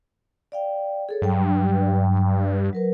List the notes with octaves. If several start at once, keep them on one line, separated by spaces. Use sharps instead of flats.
D5 F5 G5
G#4 A4 C#5
G2 F#3 G5
F#3 A#4 B4